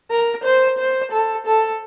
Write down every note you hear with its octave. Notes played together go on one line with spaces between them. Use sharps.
A#4
C5
C5
A4
A4